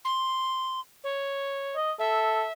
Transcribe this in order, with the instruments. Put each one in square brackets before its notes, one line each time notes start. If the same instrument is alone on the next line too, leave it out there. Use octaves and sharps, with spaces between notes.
[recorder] C6
C#5
[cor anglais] D#5
[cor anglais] A4 [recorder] E5